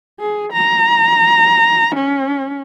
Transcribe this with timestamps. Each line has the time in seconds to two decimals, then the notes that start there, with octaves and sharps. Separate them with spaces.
0.20 G#4
0.53 A#5
1.96 C#4